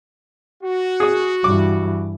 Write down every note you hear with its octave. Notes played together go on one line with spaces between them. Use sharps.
F#4
G#4 D#6
G2 E3 D6